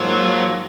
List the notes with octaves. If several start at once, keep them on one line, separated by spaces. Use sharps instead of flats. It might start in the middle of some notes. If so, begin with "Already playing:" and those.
Already playing: G#2 F3 F#3 A#3 F4